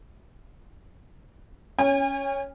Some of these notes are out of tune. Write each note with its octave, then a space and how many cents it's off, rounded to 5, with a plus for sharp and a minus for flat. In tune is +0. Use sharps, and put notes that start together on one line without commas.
C#4 +0 G#5 -40